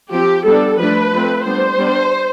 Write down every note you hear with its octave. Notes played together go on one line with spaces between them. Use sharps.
F3 C4 G4
G3 B3 D4 A4
F3 A3 D4 B4
F3 A3 C4
G3 B3 D4 C5
G3 B3 D4